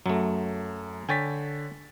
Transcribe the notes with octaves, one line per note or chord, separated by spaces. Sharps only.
F#2 F#3 A3
D3 C#5 G5 G#5 A6 B6